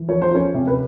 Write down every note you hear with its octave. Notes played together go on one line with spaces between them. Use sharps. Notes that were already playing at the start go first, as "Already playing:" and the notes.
Already playing: E3
F3 C#5
C5
F3 C#4 C#5
C3
B4